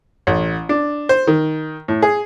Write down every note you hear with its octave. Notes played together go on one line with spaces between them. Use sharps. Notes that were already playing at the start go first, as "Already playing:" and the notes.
A1
D4
C5
D#3
A2
G#4